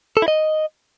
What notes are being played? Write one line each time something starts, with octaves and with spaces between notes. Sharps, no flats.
A4
E4
D#5